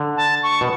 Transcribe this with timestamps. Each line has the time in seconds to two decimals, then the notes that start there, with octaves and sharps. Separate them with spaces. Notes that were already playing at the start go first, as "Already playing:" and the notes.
Already playing: D3
0.17 A5
0.43 C#6
0.61 B2